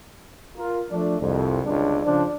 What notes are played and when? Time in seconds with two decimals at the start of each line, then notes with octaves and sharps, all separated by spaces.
0.58 F4 A#4
0.91 F3 A3 D4
1.21 C2 F2
1.65 G1 C#2 D4
2.05 C#3 F3 D4